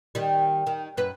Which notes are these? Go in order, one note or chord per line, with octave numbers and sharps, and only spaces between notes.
D#3 G3
D#3
F#2 B4